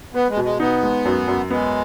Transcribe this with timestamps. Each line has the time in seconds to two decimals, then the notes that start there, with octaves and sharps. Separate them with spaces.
0.14 B3 B4
0.29 G#3
0.37 B2
0.44 G#3
0.60 B3 D#4
0.83 G#3
1.05 F#2
1.28 F#2
1.50 G#3 B3